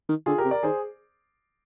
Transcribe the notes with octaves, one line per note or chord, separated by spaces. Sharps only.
D#3
D3 F4 G#4
G4 A#4
C3
A#4 D5
D#3 G#4 C5